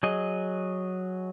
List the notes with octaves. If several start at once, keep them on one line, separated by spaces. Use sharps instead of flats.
F#3 G#4 D#5